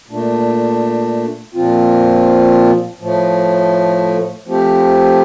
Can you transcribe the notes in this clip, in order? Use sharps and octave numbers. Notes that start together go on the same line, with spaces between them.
A#2 A3 D4
A#2 F3 C4 F4
A2 F3 A3
F3 A3 C4 G4